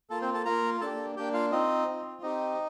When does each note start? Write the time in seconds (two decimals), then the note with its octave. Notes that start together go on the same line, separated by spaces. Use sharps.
0.10 A#3 F4 A4 A5
0.22 C4 C5
0.34 A4 A5
0.45 A#3 F4 A#4 A#5
0.81 A#3 D4 G4 A4 A5
1.16 A#3 D4 G4 G5
1.34 F4 F5
1.52 C4 D#4 F4 D#5
1.88 C4 F4
2.22 C4 D#4 G4 D#5